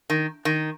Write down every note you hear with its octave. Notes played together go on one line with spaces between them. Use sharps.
D#3
D#3